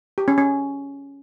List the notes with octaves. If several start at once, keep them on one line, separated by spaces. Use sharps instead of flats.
G4
C#4
C#4